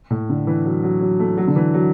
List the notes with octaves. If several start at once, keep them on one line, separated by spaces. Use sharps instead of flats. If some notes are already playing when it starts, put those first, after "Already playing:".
A2
D3
E3
F#3
F#3
F#3
A3
F#3
D3
E3
F#3